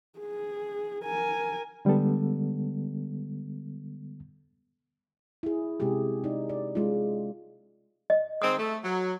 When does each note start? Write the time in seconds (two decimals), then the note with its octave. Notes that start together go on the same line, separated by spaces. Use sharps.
0.19 G#4
1.04 A#4 G#5
1.85 D3 G3 G#3 B3 A4
5.43 E4 G#4
5.80 C3 G#3 C#4 G4 G#4
6.24 D#4 D5
6.49 D5
6.75 G#3 C#4 F4
8.10 D#5
8.42 D#3 G#3 C4 D#6
8.58 A3
8.84 F#3